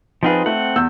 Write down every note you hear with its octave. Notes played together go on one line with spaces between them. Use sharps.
F3 C4 D#4 F4 G#4 B4
A3 C4 F#5
E2 E6 G6